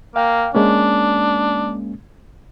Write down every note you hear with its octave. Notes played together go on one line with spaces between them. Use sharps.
A#3 F5 G5
G#3 A#3 C#4 D4